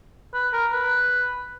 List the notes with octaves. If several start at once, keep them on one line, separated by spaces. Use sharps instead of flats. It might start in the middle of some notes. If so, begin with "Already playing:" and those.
B4
A#4
B4